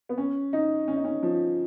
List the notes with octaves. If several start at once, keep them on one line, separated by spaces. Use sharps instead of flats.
B3
C#4
D#4
C#4
D#4
C#4
F3